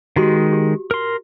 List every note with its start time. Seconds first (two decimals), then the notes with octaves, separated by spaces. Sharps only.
0.16 D#3 G#3 F#4 G4 C6
0.52 G4
0.91 A#4 C6